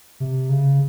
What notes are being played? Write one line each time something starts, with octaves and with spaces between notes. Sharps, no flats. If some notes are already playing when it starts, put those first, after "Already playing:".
C3
C#3